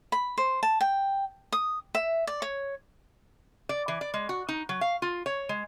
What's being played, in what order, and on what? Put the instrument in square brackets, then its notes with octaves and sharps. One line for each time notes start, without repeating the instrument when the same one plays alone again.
[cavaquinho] B5
C5
A5
G5
D#6
E5
D5
C#5
[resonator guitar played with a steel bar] D5
E3
D5
G#3
F#4
D#4
F#3
F5
F4
C#5
G#3